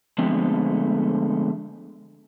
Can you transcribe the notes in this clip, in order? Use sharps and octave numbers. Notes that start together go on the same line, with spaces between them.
D3 F3 G#3 A3 B3 C4